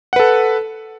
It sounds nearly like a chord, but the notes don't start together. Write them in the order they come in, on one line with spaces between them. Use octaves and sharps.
F#5 B4 A4